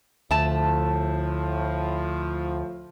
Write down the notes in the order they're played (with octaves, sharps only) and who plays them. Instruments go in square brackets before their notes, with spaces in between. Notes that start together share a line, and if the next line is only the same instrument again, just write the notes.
[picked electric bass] D2 [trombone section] A2 F3 [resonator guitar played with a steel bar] A3 A5